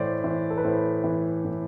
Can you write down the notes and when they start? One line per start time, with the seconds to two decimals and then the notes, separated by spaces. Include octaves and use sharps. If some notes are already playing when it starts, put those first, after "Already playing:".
Already playing: A2 E3 C5 D5
0.24 E3 C5
0.50 A4
0.58 B4
0.64 A2 C5
1.04 E3
1.45 A2